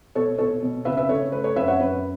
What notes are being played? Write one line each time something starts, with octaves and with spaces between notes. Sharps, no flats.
B2 A4 C#5
B2 A4 C#5
B2
C#3 B4 E5
B4 E5
C#3 A4 C#5
A3 B4
A4 C#5
F#2 B4 E5
C#5 F#5
F#2 B4